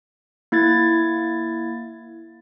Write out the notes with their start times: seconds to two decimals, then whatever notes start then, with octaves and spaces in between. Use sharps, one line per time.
0.52 A#3 E4 G#6 A6